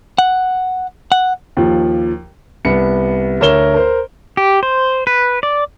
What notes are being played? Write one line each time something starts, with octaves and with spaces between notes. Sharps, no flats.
F#5
F#5
D#2 F3
C2 B3 C#7
D2 A#4 C#5 E7 G7
A#4 C5
G4
C5
B4
D5